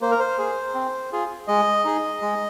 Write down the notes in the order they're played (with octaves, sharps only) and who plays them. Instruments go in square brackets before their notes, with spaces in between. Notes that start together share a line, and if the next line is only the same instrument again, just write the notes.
[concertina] A#3 C5
A#4
C5
G#4
C4
F4 G#4
G#3 D#5
D#4 G#4
G#3